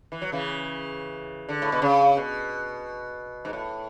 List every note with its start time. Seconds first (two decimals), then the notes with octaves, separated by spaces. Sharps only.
0.12 E3
0.22 F#3
0.32 C#3 E3
1.49 D3
1.62 A2
1.72 B2
1.82 C#3
2.17 B2
3.45 G#2
3.53 A2